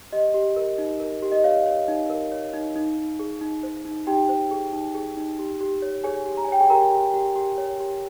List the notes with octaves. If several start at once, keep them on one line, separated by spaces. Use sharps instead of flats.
G4 D#5
G4
A#4
D#4
A#4
G4
D#5
C#5 F5
C#5
D#4
A#4
C#5
D#4
D#4
D#4
G#4
D#4
C5
D#4
D#4 G4 G5
C5
G#4
D#4
G#4
D#4
G4
G4
C#5
G#4 C#5 G#5
G4
A#5
G#5
C#5 G5
G#4 G#5
G4 A#4 A#5
G4
G4
G4
C#5
G4